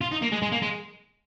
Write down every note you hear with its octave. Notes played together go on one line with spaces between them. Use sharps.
F4
D#4
A#3
G#3
G#3
A#3
G#3